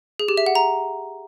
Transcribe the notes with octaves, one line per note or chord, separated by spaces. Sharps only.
G#4
G4
E5
F#5
A#5